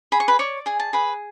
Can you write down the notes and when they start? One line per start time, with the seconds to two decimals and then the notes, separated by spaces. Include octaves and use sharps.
0.12 G#4 B5
0.20 C#6
0.28 B4 B5
0.39 C#5 D5 C#6
0.66 G#4 G#5
0.80 A5
0.93 G#4 B4 B5